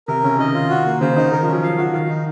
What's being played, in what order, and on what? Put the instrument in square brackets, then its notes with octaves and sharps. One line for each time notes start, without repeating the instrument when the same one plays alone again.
[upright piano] C3 [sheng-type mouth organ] A#4
[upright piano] C#3 [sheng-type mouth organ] C#4
[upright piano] D#3 [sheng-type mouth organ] D#5
[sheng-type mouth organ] F4
F#4
A#3
[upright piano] C#3 [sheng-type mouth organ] C5
[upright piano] C#3 [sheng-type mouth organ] D#4
[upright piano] D#3 [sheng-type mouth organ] A#4
[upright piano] F3
[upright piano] F#3 [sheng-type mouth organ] C#4
[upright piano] F3 [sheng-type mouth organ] F5
[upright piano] F3 [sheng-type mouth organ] F#4
[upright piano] D#3 [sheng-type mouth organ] F5
[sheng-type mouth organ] D#4